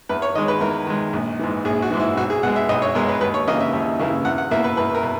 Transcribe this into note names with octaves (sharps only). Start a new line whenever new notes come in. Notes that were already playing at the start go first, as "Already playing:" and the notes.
E2 B4
C#5
D#3 G#3 D#5
B4
E2 A#4
D#3 G#3
A#1
G#2 E3
A#1 G#4
F#4
G#2 E3
E4
B1 F#4
G#4
B2 G#3 F#5
E5
B1 D#5
C#5
B2 G#3 A#4
B4
D#2 B4
C#5
C#3 E3 A#3 E4 D#5
E5
D#2
C#3 E3 A#3 E4
E2 F#5
F#5
B2 A#3 E4 E5
B4
E2 B4
A#4
B2